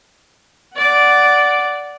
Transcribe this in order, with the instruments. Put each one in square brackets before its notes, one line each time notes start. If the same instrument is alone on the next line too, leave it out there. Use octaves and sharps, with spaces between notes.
[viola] D5 F#5